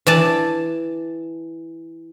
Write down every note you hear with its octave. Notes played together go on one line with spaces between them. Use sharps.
E3 D5 A5